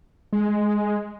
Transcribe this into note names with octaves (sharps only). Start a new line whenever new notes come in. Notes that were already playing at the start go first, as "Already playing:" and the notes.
G#3